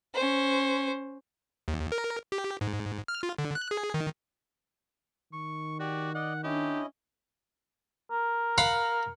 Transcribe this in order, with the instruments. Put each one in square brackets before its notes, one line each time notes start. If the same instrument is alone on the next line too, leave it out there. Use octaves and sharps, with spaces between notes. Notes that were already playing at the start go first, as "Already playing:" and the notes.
[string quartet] C#4 C5
[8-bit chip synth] D#2
A#4
G4
G#2
F6
F4
D3
F#6
G#4
D#3
[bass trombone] D#3 [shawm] C#6
[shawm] F#4 [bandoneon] G4 D5
[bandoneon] D5 D#5 [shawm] F#5
[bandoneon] C#4 E4 D#5 [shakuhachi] D4 [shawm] G4
[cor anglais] A#4
[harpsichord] F5 F#5 B5